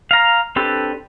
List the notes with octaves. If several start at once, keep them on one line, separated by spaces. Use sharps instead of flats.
F5 A#5
C4 D4 G4 A4 B4